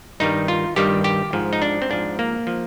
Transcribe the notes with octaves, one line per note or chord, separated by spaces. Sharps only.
G2 D#3 G3 D#4
F4
G2 D#3 G3 G4
G4
G#2 F3
D#4
D4
C4
G#2 F3 D4
A#3
F3